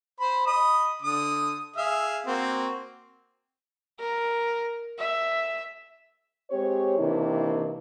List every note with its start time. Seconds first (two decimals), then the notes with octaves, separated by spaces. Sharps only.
0.20 C5 B5
0.46 D#5 B5 D#6
1.02 D3 D#6
1.76 G#4 E5 F5
2.27 A#3 C4 F#4
3.99 A#4
4.99 E5
6.51 G#3 C4 G4 C#5
6.98 C3 D#3 E3 A#3 D4 E4